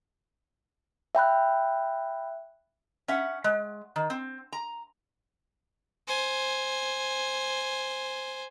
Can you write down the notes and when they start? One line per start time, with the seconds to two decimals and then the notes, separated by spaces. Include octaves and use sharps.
1.15 E5 G5 B5 F#6
3.08 C#4 E5 F#5
3.44 G#3
3.96 D#3
4.10 C4
4.52 A#5
6.08 C5 G#5